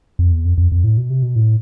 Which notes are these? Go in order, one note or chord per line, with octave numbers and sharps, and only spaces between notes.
F2
E2
F2
F2
F2
A2
B2
C3
B2
A2